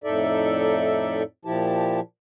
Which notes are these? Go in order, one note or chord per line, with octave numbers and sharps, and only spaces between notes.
F2 A2 D#4 A4 D5 E5
A#2 F3 E4 G4 A5